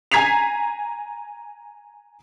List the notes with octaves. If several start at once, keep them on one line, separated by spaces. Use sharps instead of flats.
G#5 A#5 G#6 B6 C7 F7